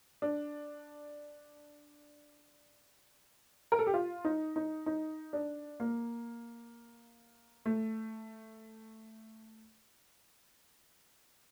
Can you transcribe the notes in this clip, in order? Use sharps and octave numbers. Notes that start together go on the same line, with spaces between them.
D4
A#4
A4
G4
F4
D#4
D#4
D#4
D4
A#3
A3